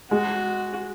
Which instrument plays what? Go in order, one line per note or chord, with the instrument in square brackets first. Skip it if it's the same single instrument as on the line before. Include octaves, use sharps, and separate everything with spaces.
[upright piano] G#3 [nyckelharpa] F#4